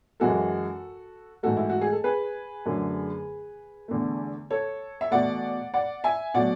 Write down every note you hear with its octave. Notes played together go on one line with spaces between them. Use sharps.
F#2 E3 G#3 F#4 A4
G#2 E3 A3 F#4 A4
E4
F#4
G#4
A4
G#4 B4
F#2 D3 F#3 A3
E2 D3 A3
A4 C#5
E5
E2 B2 A3 D5 F#5
D5 F#5
E5 G#5
B2 F#3 A3 D5 F#5